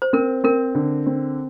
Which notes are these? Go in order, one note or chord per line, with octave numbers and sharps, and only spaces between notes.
C5
C4 A#4
C4 A#4
D3
C4